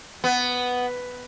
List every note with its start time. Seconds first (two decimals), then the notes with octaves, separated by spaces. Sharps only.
0.24 B3